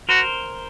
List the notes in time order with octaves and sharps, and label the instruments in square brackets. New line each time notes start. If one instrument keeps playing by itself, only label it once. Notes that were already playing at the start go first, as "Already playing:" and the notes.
[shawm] F#4 [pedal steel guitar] A#4 C5